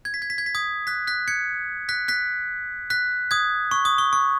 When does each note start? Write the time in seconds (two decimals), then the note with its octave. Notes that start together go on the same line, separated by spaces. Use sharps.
0.05 G#6
0.14 B6
0.22 G#6
0.30 B6
0.38 G#6
0.46 B6
0.55 D#6 G#6
0.87 F#6 B6
1.07 F#6 B6
1.28 G#6 C#7
1.89 F#6 B6
2.08 F#6 B6
2.90 F#6 B6
3.31 D#6 G#6
3.71 C#6
3.85 D#6
3.98 C#6
4.13 C#6